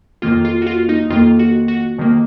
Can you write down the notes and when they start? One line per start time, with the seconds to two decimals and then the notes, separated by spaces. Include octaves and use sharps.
0.22 F2 D#3 A#3 F4
0.45 F4
0.62 F#4
0.66 F4
0.89 D#4
1.10 F2 D#3 A#3 F4
1.39 F#4
1.68 F#4
1.98 F2 D#3 A#3